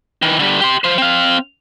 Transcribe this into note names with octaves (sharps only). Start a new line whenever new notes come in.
D#3 E3
D3 G3
G4 C6
F3 C5
C4 F5